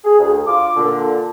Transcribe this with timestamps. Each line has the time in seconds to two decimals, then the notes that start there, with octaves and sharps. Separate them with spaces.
0.05 G#4
0.19 D2
0.47 F4 D6
0.76 A#2 D3